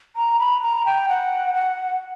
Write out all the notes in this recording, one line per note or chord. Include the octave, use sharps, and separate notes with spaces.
A#5
B5
A#5
G5
F#5
F#5